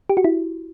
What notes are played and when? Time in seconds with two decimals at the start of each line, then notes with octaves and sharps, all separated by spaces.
0.09 G4
0.17 F#4
0.24 E4